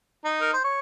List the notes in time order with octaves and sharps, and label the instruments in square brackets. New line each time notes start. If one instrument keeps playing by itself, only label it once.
[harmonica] D#4
A#4
C5
C#5